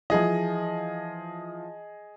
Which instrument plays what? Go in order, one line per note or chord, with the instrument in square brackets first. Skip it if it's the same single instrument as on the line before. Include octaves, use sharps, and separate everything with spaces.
[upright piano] E3 F3 [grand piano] G#4 D#5